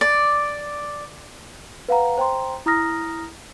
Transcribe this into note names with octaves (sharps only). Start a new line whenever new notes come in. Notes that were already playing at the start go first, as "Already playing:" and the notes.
D5
B4 F5 F#5 A#5
C5 G5 A#5 C6
E4 A#5 D#6 F6 A#6